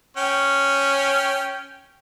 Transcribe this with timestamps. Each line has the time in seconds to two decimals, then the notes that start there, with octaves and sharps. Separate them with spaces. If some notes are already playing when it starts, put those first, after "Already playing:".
0.17 C#4 G5